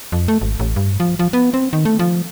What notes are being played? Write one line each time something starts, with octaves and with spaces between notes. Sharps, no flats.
F2
A3
G#1
A1
G2
F3
F3
B3
C4
D#3
A3
F3